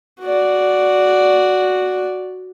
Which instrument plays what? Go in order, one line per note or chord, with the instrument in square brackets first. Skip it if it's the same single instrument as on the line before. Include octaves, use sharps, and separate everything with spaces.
[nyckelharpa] F#4 D5